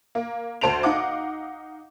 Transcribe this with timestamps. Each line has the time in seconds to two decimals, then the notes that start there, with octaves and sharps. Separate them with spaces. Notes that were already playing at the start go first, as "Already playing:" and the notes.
0.15 A#3
0.61 D2 C5 A5 D7 F7
0.83 D#4 F5 F#5 D6